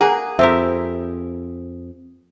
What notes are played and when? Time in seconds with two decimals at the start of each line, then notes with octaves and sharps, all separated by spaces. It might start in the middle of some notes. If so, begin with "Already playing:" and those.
0.01 A#3 G#4 F#5 A#5
0.39 F2 C4 G4 A#4 E5